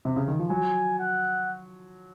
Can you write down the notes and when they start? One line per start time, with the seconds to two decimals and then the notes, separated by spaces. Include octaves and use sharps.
0.05 C3
0.16 C#3
0.28 D#3
0.39 F3
0.49 F#3 G#5
0.99 F#5